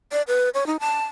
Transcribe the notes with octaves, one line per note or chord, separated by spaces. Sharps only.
D5
B4
C#5
D#4
A5